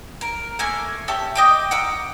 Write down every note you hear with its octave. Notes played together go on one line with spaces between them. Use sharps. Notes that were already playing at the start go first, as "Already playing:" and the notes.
A#4
A3 A#3 G#5
C#4 G4 E5 A5
D#5 G5 D6
F#5 A#5 D6 E6